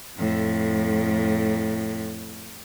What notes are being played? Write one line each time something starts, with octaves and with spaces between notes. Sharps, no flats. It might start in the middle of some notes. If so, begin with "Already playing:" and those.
F2 A2